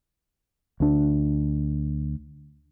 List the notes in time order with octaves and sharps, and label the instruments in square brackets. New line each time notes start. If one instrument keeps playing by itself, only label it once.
[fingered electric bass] D2 D4